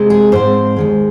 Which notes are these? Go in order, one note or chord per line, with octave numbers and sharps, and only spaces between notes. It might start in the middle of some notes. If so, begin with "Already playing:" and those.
Already playing: C3 G#3 C4
G#4
G#2 F3 C4 C5
D#2 D#3 G#3